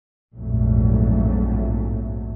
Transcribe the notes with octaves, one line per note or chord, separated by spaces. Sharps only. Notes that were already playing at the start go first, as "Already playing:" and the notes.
A#1 F2 G#2 F#3 A3